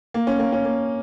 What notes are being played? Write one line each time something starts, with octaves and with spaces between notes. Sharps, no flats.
A#3
C#4
A#3
C#4
A#3